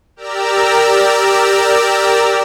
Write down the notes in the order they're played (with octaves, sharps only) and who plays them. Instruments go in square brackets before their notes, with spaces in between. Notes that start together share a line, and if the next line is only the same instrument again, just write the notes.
[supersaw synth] G4 A#4 D5 A#5 E6